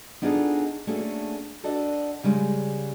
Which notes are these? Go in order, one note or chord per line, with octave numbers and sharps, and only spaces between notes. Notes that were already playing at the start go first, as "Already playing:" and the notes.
B3 D4 D#4 F4 G#4 A4
A3 A#3 C#4 D4 F#4 G#4
D4 F#4 A4 D5 D#5
C#3 G3 G#3